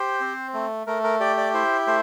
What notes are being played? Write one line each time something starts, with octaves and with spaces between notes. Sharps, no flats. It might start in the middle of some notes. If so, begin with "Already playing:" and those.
Already playing: G4 C5
C4
A3
A3 A#4
A#4
G4 D5
D5
E4 C5
A3 C5